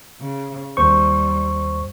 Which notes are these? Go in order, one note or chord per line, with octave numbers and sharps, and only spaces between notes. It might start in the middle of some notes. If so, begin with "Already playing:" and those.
C#3
D#2 G3 C5 C#6